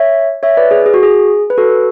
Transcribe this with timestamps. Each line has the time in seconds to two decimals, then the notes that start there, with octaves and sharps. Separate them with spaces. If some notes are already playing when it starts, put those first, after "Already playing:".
Already playing: C#5 E5
0.43 C#5 E5
0.57 B4 D5
0.71 G#4
0.86 G#4
0.94 F#4
1.03 G#4
1.50 B4
1.58 F#4 A4